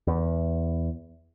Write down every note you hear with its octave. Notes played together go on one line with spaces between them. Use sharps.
E2